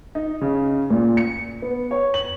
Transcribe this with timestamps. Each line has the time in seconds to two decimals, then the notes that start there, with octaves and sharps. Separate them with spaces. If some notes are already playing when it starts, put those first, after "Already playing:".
0.15 D#4
0.41 C#3
0.90 A#2
1.17 C#7
1.62 B3
1.91 C#5
2.14 F#7